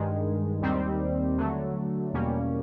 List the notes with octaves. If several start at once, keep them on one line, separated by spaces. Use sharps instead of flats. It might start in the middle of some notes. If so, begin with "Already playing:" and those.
Already playing: G2 D#3 G#3
D#2 D#3 G3 C4
D3 F#3 A3
E2 B2 G3 A#3 C#4